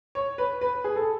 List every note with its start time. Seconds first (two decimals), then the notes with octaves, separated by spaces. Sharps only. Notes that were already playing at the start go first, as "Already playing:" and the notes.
0.15 C#5
0.38 B4
0.61 B4
0.84 G#4
0.96 A4